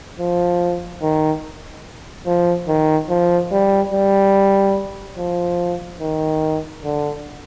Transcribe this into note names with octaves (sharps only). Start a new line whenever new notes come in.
F3
D#3
F3
D#3
F3
G3
G3
F3
D#3
D3